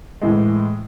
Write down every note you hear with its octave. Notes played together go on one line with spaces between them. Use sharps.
A2 E3 G#3